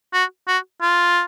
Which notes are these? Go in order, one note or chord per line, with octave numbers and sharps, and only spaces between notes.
F#4
F#4
F4